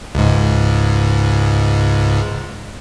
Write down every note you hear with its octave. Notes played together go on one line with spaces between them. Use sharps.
C#2 G#2